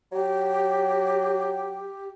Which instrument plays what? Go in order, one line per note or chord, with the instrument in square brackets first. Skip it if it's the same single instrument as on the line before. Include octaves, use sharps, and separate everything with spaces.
[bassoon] F#3 [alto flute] G4